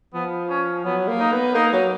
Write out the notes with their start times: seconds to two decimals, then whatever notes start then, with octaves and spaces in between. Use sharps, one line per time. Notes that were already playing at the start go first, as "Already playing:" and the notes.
0.14 F3 B3
0.50 C#4
0.85 F#3 B3
1.08 A#3
1.20 D#4
1.32 B3
1.55 A#3 D#4
1.73 F#3